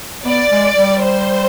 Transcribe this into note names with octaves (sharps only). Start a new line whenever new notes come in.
B3 D5
G#3
G3
C5